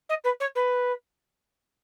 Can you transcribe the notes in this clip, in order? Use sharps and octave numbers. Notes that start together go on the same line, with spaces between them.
D#5
B4
C#5
B4